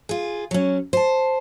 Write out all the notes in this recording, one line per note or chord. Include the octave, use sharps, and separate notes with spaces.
F4 G#4
F#3 C#4
C5 A5